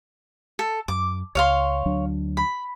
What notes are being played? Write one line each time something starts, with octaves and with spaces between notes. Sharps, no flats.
A4
F#2 D6
C#2 C#5 F5 C6
D2 F#3 D4
B5